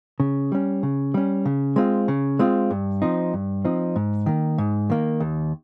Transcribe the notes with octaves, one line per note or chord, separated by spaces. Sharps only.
C#3
G3 C#4
C#3
G3 C#4
C#3
G#3 C4 F4
C#3
G#3 C4 F4
G2
F3 C4 D#4
G2
F3 C4 D#4
G#2
D#3 A#3
G#2
D#3 A#3
D#2